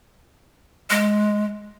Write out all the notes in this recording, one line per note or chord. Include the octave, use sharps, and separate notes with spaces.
G#3